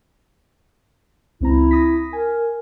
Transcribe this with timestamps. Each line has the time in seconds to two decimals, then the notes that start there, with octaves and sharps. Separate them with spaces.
1.41 C#2 C4 E4 A#5
1.71 D#6 A#6 B6
2.13 A#4 G#5